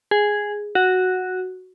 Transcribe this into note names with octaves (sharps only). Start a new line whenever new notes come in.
G#4
F#4